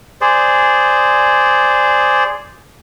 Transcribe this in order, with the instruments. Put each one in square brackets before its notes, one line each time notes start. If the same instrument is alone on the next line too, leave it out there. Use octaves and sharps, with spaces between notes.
[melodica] G#4 C5 D5